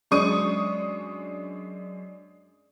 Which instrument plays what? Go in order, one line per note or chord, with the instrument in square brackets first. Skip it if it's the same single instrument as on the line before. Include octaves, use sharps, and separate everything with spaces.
[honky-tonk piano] F#2 G#3 D4 C#6 D#6 D#7